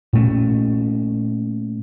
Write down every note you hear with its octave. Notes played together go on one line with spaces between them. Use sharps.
A#2 A3 C#4